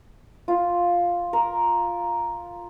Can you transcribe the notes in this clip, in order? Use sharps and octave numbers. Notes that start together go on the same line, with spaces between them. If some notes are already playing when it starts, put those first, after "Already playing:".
F4
A#4